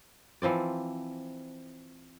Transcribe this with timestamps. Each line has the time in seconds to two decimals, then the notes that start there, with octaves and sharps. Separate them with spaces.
0.42 E3 F3 C4 D5